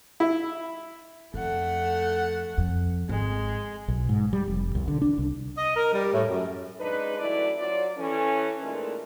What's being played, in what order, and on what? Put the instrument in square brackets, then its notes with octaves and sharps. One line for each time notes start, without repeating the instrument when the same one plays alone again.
[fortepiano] E4
[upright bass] F2 [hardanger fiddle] A3 F#5
[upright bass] F2
[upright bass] G#1 [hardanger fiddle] G#3
[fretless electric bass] B1
G#2
G3
F1
C2
D3
D4
C2
[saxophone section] D#5
A#4
G3
A2
F#2
[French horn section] C#3 G#3 D4 D#4 B4
F#2 E3 A3 E4 D5
F#3 F4 D5
E3 C#4 A4
A#2 E3 G#3 A3 D#4 A#4